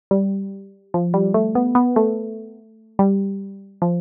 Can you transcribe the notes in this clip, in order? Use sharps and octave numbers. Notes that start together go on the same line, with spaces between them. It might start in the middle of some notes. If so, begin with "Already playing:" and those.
G3
F3
G3
A3
B3
B3
A3
G3
F3